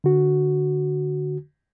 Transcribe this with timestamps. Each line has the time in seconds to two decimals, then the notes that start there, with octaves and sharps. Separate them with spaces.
0.04 D3 F#4